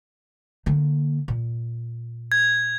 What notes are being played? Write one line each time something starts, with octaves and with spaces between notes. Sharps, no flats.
D3 A#3
A#2
G#6